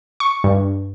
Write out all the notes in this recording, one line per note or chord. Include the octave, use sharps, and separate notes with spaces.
C#6
G2